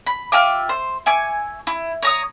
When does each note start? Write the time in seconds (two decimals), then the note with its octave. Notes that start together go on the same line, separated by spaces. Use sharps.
0.07 B5
0.32 F4 G4 E5 D6
0.69 C5
1.06 E5 G#5 C#6 D6
1.67 E4
2.02 C#5 A#5 D#6